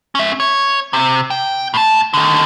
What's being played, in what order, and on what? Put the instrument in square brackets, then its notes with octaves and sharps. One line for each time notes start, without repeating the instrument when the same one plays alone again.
[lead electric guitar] C#4 E5
C#5
C3
G5
A2 A5
D3 D#3